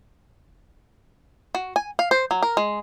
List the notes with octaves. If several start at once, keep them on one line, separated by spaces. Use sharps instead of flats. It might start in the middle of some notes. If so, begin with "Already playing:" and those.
F#4
G#5
F5
C5
F#3
A#4
G#3